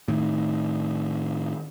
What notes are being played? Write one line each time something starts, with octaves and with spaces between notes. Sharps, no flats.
A2 D#3